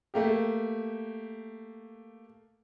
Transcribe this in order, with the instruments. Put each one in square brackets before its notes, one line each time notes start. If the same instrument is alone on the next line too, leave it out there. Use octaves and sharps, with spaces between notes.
[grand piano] A3 A#3 G4